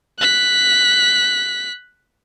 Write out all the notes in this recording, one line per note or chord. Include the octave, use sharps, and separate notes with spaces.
F#6 B6